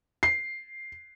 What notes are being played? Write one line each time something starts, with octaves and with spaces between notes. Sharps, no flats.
C7